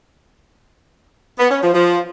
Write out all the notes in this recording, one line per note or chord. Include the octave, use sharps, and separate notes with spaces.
B3
C#4
F3
F3